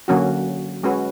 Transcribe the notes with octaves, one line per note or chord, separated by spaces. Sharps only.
D3 F#3 A#3 C#4 F#4
G#3 C#4 F#4 B4